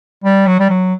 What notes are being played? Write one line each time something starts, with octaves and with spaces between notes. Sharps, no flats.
G3
F#3
G3
F#3